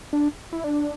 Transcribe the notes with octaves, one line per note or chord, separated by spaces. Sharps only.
D4
E4
D4